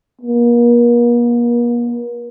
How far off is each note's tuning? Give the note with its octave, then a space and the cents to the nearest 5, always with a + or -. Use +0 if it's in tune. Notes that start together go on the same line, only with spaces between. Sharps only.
A#3 +40